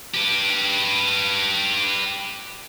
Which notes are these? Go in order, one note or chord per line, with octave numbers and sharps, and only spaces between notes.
G4 B4